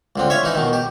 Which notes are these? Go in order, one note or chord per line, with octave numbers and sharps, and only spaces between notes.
C#2 D3 C4
C#5 E5 F5
E3 D#4
B2 D#3
G4